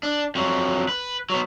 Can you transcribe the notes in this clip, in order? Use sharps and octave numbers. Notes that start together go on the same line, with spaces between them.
D4
F2 F#3
B4
F#3 B3